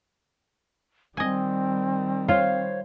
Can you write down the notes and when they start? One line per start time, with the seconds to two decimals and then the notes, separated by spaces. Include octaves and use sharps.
1.17 D#3 G3 C4 D#5 G#5
2.28 F4 C5 C#5 F5